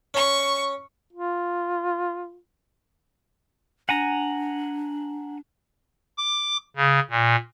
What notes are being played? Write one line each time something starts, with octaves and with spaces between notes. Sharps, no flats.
C#4 C#6
F4
D4 F#5 G#5 A#5
D6
C#3
A#2